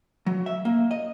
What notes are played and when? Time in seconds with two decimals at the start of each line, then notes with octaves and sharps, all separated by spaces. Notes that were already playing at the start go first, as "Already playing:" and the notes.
0.26 F#3
0.46 E5
0.65 A#3
0.91 D#5